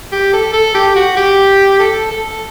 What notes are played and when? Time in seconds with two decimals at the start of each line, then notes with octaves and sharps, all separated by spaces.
0.12 G4
0.33 A4
0.53 A4
0.75 G4
0.96 F#4
1.17 G4
1.79 A4
2.11 A4